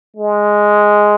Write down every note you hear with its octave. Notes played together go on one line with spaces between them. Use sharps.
G#3